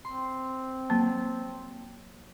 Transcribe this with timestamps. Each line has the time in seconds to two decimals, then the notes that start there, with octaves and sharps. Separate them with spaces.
0.05 C4 C6
0.90 F#3 A#3